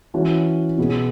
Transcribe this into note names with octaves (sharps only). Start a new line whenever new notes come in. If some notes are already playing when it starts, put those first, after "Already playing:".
E3 C#4 F#4
B2 B3 G#4